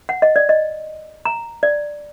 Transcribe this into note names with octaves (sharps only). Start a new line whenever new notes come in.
F#5
D#5
D5
D#5
A#5
D5